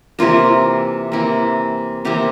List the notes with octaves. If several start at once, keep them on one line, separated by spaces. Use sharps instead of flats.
C3 E3 A#3 F4
C3 E3 A#3
C3 E3 A#3 G4